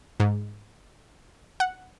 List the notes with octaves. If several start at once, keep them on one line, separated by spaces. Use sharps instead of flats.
G#2
F#5